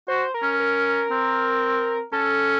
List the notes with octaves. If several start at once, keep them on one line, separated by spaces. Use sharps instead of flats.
F#4 C5
A#4
C#4
A#4
C4
C#4 A4